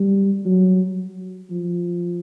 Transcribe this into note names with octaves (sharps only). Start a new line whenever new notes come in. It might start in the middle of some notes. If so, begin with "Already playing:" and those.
Already playing: G3
F#3
F3